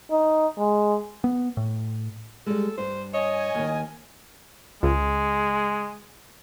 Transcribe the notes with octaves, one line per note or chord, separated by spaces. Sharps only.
D#4
G#3
B3
A2
G3 G#3 A4
G2 C5
C#5 D#5 G#5
D#2 D#3
C#2 G#3